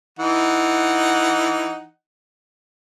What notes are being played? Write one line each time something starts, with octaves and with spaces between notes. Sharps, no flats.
E3 D#4 F#5